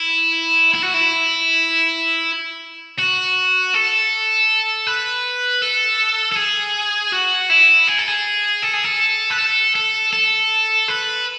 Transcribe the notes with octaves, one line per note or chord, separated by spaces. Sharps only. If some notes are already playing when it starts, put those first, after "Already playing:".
Already playing: E4
E4
F#4
E4
F#4
A4
B4
A4
A4
G#4
F#4
E4
G#4
A4
G#4
A4
G#4
A4
B4
A4
A4
A4
B4